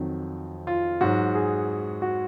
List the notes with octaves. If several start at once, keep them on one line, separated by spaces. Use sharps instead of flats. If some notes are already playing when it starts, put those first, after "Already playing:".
Already playing: F2 D#3 F#3
F4
G#2 F#3 F#4
G#4
F#4